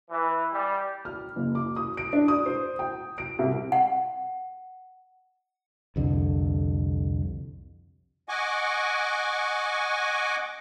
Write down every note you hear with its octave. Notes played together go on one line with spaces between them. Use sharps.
E3
G3
F6
F#1
D6
D#6
D7
D4
D#6
C5
G5
D7
C2
F#5
C2 F2 D3
D#5 F#5 G#5 C#6 D6